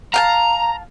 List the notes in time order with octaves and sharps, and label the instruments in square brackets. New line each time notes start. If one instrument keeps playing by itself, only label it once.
[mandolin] F5 G5 A5 [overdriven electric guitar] A#5